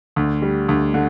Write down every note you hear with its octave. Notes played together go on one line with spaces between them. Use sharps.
D2
G3
D2
D3